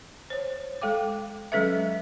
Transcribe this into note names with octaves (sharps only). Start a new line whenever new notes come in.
C5 C#5
G#3 A4 F5 G5 D6
F#3 G#3 C#4 A4 B4 E5